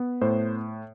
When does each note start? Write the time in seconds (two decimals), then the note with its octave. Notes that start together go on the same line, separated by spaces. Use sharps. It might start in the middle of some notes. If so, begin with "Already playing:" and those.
Already playing: B3
0.22 A2 C5